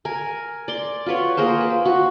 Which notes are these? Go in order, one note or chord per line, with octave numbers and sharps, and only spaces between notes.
A#4 G#5
D5 C6
F4 F#4 B4 C#5
A#3 G#4 A#4 C5
B4
F#4